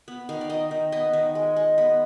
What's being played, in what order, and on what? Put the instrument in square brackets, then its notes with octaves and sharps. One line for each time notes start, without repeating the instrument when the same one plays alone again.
[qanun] B3
D#3 F5
D5
D#3 D#5
D#3
B3 D#5
D#3
G#3
G#3
B3